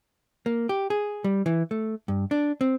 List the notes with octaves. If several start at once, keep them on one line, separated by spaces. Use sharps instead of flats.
A#3
G4
G#4
G3
E3
A3
G2
D4
C4